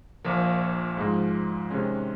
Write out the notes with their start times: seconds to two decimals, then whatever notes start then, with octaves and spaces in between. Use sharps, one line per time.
0.24 A#1 A#2 F3 A#3
0.97 G#2 F3 G#3
1.71 C3 D#3 G#3 C#4